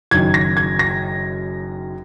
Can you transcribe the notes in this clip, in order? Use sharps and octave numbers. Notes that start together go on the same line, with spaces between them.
F#1 F#2 D#3 G#6
A#6
G#6
A#6